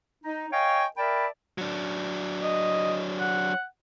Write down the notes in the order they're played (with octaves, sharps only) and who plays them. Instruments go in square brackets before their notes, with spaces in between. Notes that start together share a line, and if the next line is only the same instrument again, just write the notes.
[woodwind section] D#4
C#5 D#5 F5 G5 G#5 C#6
A#4 D5 E5 G5 A5 B5
[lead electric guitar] F#3 D4
[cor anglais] D#5
F#5